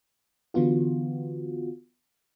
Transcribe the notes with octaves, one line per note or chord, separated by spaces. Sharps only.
D3 E3 B3 F4 F#4